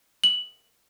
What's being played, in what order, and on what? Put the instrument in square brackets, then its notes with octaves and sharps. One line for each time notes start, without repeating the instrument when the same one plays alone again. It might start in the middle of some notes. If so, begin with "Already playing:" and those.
[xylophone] F#7